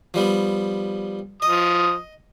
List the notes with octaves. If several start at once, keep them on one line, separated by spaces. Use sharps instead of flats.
F3 G3 B3
F3 D#5 D#6